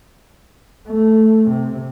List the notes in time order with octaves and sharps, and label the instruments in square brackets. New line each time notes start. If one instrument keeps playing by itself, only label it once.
[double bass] A3
C3